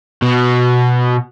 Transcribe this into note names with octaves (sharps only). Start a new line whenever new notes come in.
B2